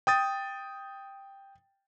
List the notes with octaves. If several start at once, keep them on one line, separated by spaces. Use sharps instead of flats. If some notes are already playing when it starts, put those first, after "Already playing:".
G5 D#6 A6